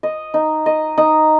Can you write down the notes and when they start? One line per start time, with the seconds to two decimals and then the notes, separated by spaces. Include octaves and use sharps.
0.03 D#5
0.34 D#4
0.66 D#5
0.98 D#4